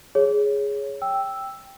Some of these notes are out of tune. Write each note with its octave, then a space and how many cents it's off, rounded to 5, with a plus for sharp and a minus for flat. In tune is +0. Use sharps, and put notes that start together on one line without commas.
G#4 +0 C#5 +0
G5 +0 E6 +0